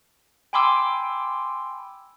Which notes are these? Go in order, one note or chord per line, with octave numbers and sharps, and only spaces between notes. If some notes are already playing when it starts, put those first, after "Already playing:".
G5 G#5 B5 C6 D6 E6